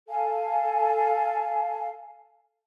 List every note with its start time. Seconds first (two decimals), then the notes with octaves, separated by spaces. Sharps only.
0.08 A4 F5 G#5 A5